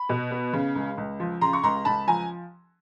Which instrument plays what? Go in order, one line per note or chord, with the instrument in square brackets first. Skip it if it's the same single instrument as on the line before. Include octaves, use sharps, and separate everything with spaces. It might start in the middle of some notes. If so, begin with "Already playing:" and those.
Already playing: [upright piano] B5
B2
B3
C#3
C#2
C#2
F3
C#3 A#5 C6
C#6
C#2 A#5 C6
C#2 A5 B5
F3 G#5 A#5